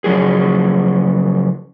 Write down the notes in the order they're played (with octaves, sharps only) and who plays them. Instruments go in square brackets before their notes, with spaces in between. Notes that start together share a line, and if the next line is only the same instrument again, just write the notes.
[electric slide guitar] C#3 F3 F#3 G4 G#4